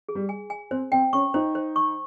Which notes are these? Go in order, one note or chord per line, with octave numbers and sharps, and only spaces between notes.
G#4
G3
G#5
G#5
C4 C5
C4 G5
C#4 C#6
D#4 C5
C5
C#6